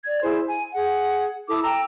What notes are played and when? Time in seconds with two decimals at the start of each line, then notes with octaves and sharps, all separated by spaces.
0.04 D5 G#6
0.22 E4 G#4 C5
0.46 G#5
0.73 G#4 F#5
1.48 E4 A4 D6 D#6
1.63 G5 A#5 E6